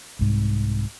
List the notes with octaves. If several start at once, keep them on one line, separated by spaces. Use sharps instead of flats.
C2 G#2